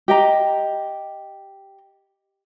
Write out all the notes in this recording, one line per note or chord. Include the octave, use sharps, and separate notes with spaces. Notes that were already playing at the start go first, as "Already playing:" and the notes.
G4 D#5 A#5